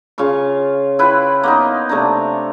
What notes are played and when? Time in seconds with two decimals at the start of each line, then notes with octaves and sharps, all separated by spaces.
0.18 C#3 F4 F5 C#6
0.99 E4 F4 B4 G5
1.43 A#3 B3 D#4
1.89 C3 A3 D4 A#5